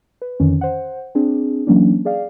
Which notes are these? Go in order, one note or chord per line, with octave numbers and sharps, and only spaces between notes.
B4
F2 D3 D#3 C#4
C5 F#5
C4 D4 G#4
E3 F#3 A#3 C#4 D4
G#4 D5 F5